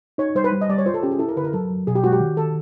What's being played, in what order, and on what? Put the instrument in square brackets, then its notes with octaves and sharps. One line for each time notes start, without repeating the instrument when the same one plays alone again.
[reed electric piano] D#4 [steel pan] C#5
[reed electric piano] G3 [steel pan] C5
[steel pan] B4
[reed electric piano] G3
[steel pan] D#5
[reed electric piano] G3 [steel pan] D5
[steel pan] C#5
[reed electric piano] F4 [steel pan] C5
[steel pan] A4
[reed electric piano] C#4 [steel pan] G4
[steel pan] G#4
[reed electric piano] E4 [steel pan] A4
[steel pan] A#4
[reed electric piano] D3 [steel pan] B4
[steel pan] A#4
[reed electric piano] F#3 [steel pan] A4
[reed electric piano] F#3
[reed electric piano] B2 [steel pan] G#4
[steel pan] G4
[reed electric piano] G#3 [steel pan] F#4
[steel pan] G4
[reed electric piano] D#3
[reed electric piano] D#3 [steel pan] A4